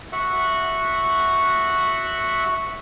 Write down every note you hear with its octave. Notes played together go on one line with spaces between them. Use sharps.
F#4 E5 F#5